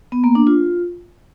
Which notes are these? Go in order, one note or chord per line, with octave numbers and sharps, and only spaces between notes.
B3
A#3
D4
F4